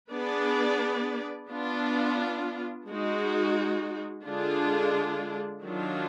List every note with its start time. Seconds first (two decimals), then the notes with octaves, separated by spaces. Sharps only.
0.12 B3 D4 G#4 B4 D5
1.50 B3 D4 F4
2.88 G#3 D#4 F#4
4.26 D3 G#3 D4 F4 G#4
5.64 D#3 F#3 D4 F4